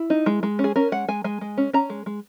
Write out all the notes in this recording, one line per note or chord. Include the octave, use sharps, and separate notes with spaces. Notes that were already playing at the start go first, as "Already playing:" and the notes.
Already playing: E4
D#4
G#3
G#3
C#4
G#4
C#4 A#4
G#3 F#5
G#3 G#5
G#3 G#5
G#3
C#4
C#4 A#5
G#3
G#3